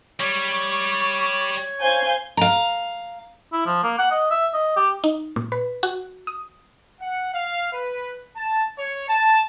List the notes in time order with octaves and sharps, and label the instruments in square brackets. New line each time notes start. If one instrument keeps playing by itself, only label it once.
[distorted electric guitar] G3 [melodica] C#5 [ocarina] C#6
[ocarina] C5 [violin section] F5 G#5 G6
[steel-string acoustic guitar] F5 A#5
[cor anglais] E4
F3
A#3
F#5
D#5
E5
D#5
G4
[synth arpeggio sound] D#4
A#2
B4
F#4
D#6
[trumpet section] F#5
F5
B4
A5
C#5
A5